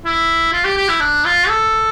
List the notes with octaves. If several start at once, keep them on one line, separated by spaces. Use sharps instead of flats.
E4
F4
G4
G4
E4
D4
F4
A4